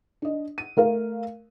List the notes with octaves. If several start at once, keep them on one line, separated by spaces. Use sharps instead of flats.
D4 D#5
D#7
A3 A#4 F5